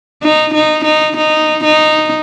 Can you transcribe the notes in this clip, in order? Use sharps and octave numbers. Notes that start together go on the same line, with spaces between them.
D#4
D#4
D#4
D#4
D#4